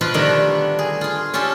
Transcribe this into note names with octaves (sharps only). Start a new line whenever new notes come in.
B2 F3 F4 B4 C5 C6
D3 D#3 G3 A3 B3 D4
G#4
F4 G#4
C#4 F4 G4 A4 C6